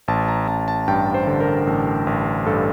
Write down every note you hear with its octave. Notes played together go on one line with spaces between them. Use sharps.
A1 A5
A#5
A1 A5
A5
G2 G5
C5
D3
A#4
A1
A1
G2 A4